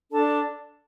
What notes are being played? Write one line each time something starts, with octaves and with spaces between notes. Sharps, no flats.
D4 A4 D5 A5